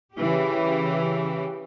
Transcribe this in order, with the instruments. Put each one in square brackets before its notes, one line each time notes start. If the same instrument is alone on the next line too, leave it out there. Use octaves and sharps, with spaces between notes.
[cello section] C#3 E3 G4